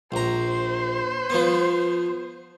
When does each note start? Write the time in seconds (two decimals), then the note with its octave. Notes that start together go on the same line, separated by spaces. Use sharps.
0.12 A#1 C5 A#5
1.30 F3 B3